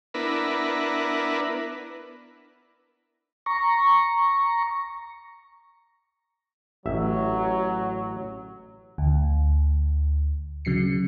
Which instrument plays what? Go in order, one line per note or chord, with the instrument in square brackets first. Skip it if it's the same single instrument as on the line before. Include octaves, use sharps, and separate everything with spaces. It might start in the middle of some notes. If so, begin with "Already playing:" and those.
[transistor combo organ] B3 D4 E4 A#4 B4
[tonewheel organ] A#5 C#6
[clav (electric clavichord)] A1 E5 [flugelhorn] F#3
[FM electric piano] D2
C#3 F#3 C7 C#7